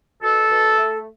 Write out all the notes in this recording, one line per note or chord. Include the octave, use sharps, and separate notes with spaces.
B2 A4
B2
A3